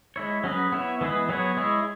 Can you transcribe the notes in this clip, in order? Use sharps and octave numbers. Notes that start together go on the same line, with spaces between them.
G#3 E4 C#5
F#3 C#4 G#4 B4
B3 E4 C#5
E3 G#3 B3 G#4 B4
F#3 B3 G#4 C#5
G#3 E4 G#4 C#5